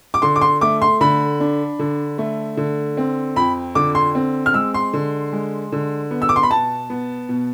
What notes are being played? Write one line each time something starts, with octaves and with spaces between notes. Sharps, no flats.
D6
D3 C6
D6
C6
A3 D6
C6
D3 B5
D4
D3
A3
D3
C4
F2 B5
D3 D6
C6
C4
F6
G#3 E6
C6
D3
G#3
D3
B3
E6
D6
C6
B5
B2 A5
B3
B2